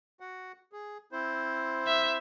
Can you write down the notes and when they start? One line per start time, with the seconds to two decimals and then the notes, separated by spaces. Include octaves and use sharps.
0.20 F#4 F#5
0.73 G#4
1.12 C4 E4 C5
1.87 E5